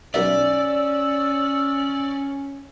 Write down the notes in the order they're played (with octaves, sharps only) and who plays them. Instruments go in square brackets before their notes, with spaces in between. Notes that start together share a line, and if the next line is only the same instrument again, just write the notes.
[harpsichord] B1 A#4 E5 [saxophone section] C#4 [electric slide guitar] D5 [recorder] E6